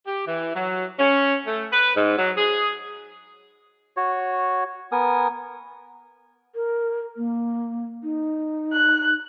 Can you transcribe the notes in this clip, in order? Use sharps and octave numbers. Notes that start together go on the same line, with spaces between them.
G4
E3
F#3
C#4
A3
B4
G#2
F#3
G#4
F#4 C#5
B3 A#4 G#5 D#6
A#4
A#3
D#4
F#6